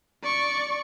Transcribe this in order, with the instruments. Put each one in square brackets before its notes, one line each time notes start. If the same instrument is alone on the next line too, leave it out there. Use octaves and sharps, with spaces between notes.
[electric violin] D5 C#6